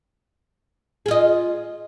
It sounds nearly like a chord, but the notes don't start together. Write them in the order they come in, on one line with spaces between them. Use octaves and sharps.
G#4 F4 D#5